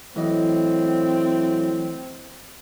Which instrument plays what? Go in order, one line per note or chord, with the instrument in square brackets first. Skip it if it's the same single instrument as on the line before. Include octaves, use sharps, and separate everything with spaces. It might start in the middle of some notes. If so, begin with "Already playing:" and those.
[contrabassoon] A2 [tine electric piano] E3 D#5 [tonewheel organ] F#3 [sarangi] C4